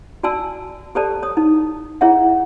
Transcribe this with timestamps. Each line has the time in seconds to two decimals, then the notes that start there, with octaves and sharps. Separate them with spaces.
0.23 F#4 D5 G#5 A5 E6
0.95 G4 A4 C5 D5 A5
1.23 C#5 D#6
1.37 D#4
2.01 E4 G#4 C#5 E5 F#5